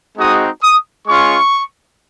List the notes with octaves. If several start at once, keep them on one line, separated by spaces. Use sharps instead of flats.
G#3 C4 D#4 F#4 D#6
D#6
G#3 C#4 F4 C#6